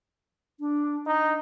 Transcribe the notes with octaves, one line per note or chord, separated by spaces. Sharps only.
D4
D#4 D#5